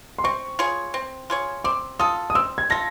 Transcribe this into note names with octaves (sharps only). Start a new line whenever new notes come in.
C6
C4 C#6
F4 G#4 C#5
C4
F4 G#4 C#5
C4 D6
F4 A4 D#6
D#6
C4 E6
G#6
F4 A4 A#6